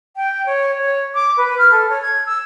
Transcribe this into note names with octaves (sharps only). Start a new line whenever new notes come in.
G5
C#5
C#5
D6
B4
F6
A4
C#5
G#6
E6